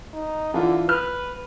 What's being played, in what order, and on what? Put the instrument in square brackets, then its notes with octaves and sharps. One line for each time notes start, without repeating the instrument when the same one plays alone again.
[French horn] D#4
[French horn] D3 [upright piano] E3 F4
[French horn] B4 [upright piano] F6